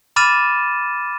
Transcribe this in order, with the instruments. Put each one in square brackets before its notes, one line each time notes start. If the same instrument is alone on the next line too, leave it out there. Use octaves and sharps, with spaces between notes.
[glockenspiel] B5 D6 F6 A6 D#7 E7